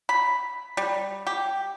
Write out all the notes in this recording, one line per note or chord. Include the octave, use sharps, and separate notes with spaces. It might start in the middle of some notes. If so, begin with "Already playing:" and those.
B5
G3
G4